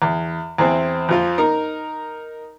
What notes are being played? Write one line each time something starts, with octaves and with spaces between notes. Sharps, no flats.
E2
E2 E3 C4
F2 F3 F4
D#4 A#4 A#5